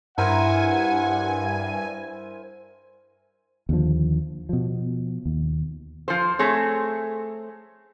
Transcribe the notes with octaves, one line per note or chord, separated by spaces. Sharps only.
G2 E4 A#4 C5 F#5 G#5
D#2 D3 F3
B2 F3
D#2
F3 C5
A3 C4 G#4 C#5